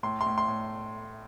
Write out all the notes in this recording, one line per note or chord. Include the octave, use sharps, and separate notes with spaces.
A2 C6
C6
A2
C6
A2